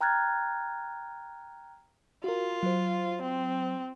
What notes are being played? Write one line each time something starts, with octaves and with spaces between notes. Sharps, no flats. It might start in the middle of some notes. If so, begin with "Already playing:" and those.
G5 A#5 F6 F#6 G#6 A6
F4 F#4 A#4
F#3 C5
C4